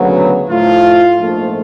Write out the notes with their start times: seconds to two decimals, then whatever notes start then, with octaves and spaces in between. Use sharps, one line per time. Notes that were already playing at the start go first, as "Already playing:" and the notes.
Already playing: D2 C#3 F#3 B3
0.49 A2 F3 A3 F4
1.20 A#1 G#2 F3 A3 F4